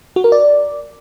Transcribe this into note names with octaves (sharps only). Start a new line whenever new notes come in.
F#4
A#4
D5